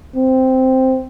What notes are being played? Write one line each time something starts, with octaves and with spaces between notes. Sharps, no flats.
C4